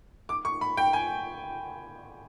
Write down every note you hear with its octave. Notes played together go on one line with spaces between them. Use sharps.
D6
C#6
B5
G5
G#5